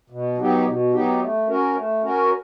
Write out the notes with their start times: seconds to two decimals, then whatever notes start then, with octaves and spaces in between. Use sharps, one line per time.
0.10 B2
0.37 F#3 B3 D#4 G4
0.65 B2
0.93 F#3 B3 D#4 G4
1.21 A3
1.48 C#4 F#4 A#4
1.75 A3
2.02 C#4 F#4 A#4